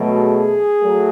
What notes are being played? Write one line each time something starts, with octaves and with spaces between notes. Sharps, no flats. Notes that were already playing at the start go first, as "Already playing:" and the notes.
Already playing: B2 F#3 A3
G#4
F#3 A3